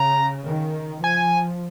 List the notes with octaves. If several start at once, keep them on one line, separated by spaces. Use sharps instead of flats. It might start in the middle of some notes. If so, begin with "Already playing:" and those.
Already playing: C#3 A#5
D#3
F3 G#5